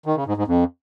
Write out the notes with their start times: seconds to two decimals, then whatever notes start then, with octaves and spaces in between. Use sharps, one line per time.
0.06 D#3
0.16 C#3
0.27 G#2
0.37 G#2
0.47 F2